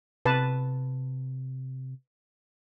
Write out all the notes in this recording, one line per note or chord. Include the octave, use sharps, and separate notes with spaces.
C3 B4 A5